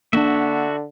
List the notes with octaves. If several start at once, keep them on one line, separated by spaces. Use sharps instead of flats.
D3 A#3 B3 D4 F#4 E5